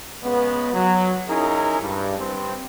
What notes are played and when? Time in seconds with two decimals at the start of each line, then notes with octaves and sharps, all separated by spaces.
0.23 C#3 G#3 B3
0.73 F#3
1.28 C#4 D#4 E4 G#4 A#4
1.81 G2
2.18 G2 C4